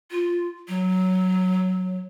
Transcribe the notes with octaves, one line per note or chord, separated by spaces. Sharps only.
F4
F#3